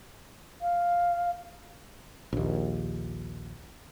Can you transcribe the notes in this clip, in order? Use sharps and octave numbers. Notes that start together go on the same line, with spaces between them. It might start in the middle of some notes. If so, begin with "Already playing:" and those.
F5
A#1 D#2